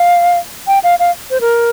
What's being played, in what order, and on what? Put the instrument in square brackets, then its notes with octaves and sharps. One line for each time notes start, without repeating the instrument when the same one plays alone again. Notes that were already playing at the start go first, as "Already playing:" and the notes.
Already playing: [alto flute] F5
G5
F5
F5
C5
A#4